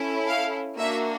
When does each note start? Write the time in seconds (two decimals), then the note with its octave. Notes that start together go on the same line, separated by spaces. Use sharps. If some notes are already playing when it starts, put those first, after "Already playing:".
Already playing: C#4 E4 A4
0.27 F5
0.78 A#3 D4 F#4 E5